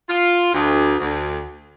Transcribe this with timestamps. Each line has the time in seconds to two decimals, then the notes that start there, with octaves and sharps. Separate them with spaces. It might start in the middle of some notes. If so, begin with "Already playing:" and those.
0.09 F4
0.54 D2
0.99 D2